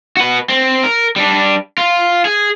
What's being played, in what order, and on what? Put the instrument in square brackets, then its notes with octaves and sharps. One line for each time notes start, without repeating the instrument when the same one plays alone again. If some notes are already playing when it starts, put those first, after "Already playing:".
[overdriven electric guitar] F#4 B4
C4
A#4
G3 D4
F4
G#4